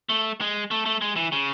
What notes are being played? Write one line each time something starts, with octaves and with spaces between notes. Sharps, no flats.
A3
G#3
A3
A3
G#3
E3
C#3